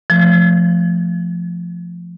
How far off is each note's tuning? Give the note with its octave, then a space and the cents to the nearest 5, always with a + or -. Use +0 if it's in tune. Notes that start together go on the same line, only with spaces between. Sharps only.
F3 -5 A3 +0